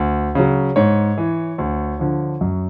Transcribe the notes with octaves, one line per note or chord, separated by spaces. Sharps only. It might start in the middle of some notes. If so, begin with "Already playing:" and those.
Already playing: D2
C#3 F#3
G#2 C#5
E3
D2
D3 F3
F#2